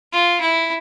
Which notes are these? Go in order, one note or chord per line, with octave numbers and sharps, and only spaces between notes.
F4
E4